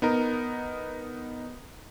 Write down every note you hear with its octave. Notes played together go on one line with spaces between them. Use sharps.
B3 D#4 A#4